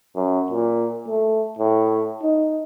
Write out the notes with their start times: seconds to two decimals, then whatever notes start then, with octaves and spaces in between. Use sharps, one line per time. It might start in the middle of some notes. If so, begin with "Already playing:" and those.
0.16 F#2
0.51 A#2
1.08 A3
1.59 A2
2.23 D#4